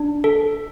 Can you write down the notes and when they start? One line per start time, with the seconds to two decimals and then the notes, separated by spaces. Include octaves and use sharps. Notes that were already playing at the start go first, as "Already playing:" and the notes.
Already playing: D4
0.24 A4